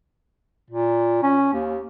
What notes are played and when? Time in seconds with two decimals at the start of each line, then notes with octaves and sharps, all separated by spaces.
0.70 A#2
1.23 C#4
1.53 D#2